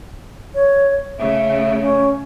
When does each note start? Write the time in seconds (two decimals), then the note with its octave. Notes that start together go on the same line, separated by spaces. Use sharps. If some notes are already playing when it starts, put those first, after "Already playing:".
0.54 C#5
1.19 C#3 A3 E5
1.82 C#4